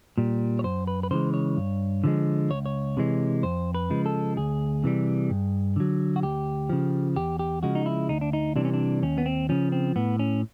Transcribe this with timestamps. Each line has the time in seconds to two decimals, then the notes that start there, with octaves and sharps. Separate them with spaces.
0.18 A#2 G3
0.59 C#5
0.64 F#2 C5
0.87 B4
1.03 B4
1.11 C#3 E3 G#3 C5
1.34 C#5
1.57 G2
2.04 D3 F3 G#3
2.50 C#2 C#5
2.66 C#5
2.97 C3 E3 G#3
3.43 F2 C5
3.75 B4
3.90 C#3 F3 G#3
4.06 A4
4.37 D2 G#4
4.84 C3 E3 G3
5.30 G2
5.76 D3 F#3
6.16 F#4
6.23 D2 G4
6.69 C#3 F3
7.16 E2 G4
7.39 G4
7.63 C#3 F3 G#3 F#4
7.75 D#4
7.86 E4
8.09 D2 D#4
8.21 D4
8.33 D#4
8.56 C3 E3 G3 D4
8.65 C#4
8.73 D4
9.03 D#2 C#4
9.18 B3
9.26 C4
9.49 C#3 F3 C#4
9.72 C4
9.96 A2 B3
10.19 C#4